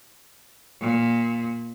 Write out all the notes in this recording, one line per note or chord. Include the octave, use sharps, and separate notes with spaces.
A#2